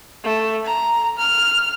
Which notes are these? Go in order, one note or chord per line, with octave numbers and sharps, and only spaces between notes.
A3
A#5
F6